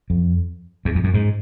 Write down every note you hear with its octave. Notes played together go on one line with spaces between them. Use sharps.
F2
E2
F2
F#2
G#2